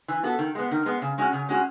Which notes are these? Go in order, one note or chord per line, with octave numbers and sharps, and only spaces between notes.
E3
B3 F#4 A4
D#3
G#3 B3
D#3
G#3 B3
C#3
G#3 C#4 F#4
C#3
G#3 C#4 F#4